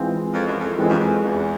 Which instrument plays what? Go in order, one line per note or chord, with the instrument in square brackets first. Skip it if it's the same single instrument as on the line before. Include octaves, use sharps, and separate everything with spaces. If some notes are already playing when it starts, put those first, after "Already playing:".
Already playing: [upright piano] E3 G#3 C4 F4
[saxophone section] F2
F#2
F2
[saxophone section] F2 [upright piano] E3 G#3 C4 F4
[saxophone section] F#2
F2
E2